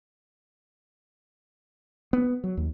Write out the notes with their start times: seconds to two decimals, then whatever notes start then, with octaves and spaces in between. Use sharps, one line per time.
2.13 B3
2.44 F#3
2.57 D#2